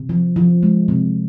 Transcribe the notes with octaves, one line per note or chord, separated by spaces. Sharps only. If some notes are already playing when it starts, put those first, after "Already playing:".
Already playing: C3
F3
F3
G#3
C3